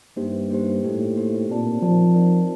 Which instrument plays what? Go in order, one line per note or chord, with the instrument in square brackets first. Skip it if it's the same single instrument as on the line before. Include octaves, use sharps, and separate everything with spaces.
[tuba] G2 [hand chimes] A#3 D#4 G4 C5
[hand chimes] A#3 D#4 G4 C5
[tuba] A2 [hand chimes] A#3 D#4 G4 C5
[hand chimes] A#3 D#4 G4 C5
[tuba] A#2 [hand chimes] C4 D#4 A#4 D5 A5
[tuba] F3 [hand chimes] C4 D#4 A#4 D5 A5
[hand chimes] C4 D#4 A#4 D5 A5